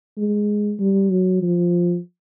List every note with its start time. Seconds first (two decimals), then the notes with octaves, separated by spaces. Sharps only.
0.18 G#3
0.79 G3
1.10 F#3
1.42 F3